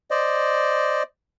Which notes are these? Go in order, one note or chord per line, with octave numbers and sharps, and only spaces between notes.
C5 D5 D#5